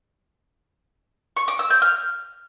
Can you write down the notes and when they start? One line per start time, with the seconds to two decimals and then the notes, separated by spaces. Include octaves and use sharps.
1.37 C#6
1.48 D6
1.59 E6
1.70 G6
1.82 F6